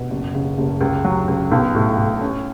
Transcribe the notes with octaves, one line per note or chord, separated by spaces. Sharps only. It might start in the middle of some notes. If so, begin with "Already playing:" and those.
Already playing: B2
F#1
C#3
F#1
C#2
F#3
C#2
B1
A2
A2
C#4